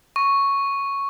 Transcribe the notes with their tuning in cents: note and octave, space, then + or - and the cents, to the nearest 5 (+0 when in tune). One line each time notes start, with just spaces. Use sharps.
C#6 +0